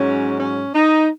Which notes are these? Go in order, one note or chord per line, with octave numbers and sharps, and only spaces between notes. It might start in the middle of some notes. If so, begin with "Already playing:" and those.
Already playing: G#2 F#3 C#4
C#4
D#4